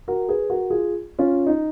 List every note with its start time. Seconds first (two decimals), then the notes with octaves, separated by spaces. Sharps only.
0.08 F#4 A#4
0.29 G#4 B4
0.50 F#4 A#4
0.70 F4 G#4
1.19 C#4 F4
1.46 D#4